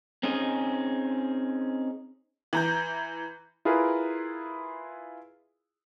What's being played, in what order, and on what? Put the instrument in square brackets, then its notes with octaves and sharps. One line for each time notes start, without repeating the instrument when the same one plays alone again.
[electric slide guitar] C4 C#4 D#4 G#4
[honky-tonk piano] E3 A#5 G6
[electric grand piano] E4 F4 G#4 A#4 B4